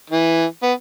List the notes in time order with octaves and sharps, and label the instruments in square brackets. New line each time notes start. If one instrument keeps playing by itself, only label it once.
[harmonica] E3
B3